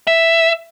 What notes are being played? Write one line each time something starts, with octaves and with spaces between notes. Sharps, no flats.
E5